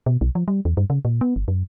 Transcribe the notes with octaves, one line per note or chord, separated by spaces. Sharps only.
B2
B1
F3
G3
E2
G2
C#3
A#2
B3
G1
F#2